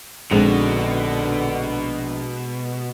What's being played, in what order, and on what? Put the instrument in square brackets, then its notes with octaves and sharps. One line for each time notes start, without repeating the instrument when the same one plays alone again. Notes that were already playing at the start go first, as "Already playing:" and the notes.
[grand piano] A#1 F7 [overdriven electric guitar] B2 [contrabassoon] D3 [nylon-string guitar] G#3 C4 D#4